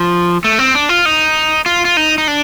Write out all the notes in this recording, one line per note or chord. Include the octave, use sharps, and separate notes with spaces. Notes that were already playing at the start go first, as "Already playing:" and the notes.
Already playing: F3
A3
C4
D4
F4
D#4
F4
F4
D#4
D#4
D4